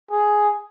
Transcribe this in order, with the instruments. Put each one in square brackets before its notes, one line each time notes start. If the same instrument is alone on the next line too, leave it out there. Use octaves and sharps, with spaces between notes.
[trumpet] G#4